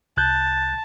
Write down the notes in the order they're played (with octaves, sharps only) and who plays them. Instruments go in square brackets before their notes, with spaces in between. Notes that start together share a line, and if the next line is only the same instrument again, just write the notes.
[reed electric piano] C2 F#6 G6 [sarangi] A5